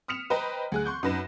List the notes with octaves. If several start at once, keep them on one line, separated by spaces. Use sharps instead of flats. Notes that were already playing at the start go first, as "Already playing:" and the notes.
D#6 F6 B6 C#7 E7 F7
B4 C5 D#5 G5 A#5
D2 G#4 F#6
C6 C#6 G6
F#2 D#4 B4 A#6 E7